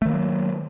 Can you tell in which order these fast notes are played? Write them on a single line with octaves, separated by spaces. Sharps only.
A3 D#3 A#3 F#3